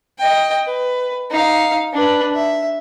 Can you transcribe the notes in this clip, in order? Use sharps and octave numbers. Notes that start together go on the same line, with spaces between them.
D#5 G5
B4
D#4 F5
D4 B4
E5